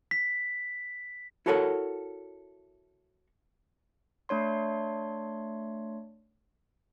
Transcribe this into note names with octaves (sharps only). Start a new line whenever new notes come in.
B6
E4 F#4 A4 A#4 C#5 F#5
A3 D4 C#5 C6